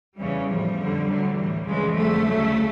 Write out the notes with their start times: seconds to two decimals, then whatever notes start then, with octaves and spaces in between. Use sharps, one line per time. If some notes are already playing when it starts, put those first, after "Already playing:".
0.18 E2 C#3 E3 G3
0.47 A2 F3 G3
0.77 F2 D3 F3
1.08 D2 D3 F#3
1.36 A2 E3 G3
1.66 F2 C#3 E3 G3 G#3
1.95 F2 D3 F3 A3
2.26 D2 C#3 F#3